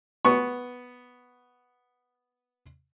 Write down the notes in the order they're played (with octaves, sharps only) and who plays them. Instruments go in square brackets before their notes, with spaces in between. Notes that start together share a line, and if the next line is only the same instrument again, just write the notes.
[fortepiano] B3 C#6